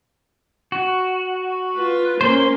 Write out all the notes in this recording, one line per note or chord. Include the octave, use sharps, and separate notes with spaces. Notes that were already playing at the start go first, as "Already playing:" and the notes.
F#4
F4 B4
A#3 C#4 C5 C6